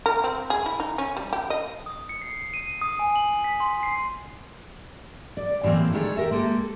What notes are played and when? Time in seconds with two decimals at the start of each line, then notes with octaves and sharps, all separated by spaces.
0.06 A#4
0.24 C4
0.50 G#4
0.66 E4
0.80 D#4
0.98 C#4
1.17 G3
1.33 G4
1.50 D#5
1.86 D#6
2.09 C#7
2.22 C7
2.54 D#7
2.82 D#6
2.99 G#5
3.16 F#7
3.44 B6
3.60 C6
3.83 C7
5.37 D5
5.63 A2 E3 G#3 A#3 C4
5.93 D3 D#3 G3 A3 G#4 C#5
6.17 G4 A#4 E5
6.31 G#3 A#3 G4 A4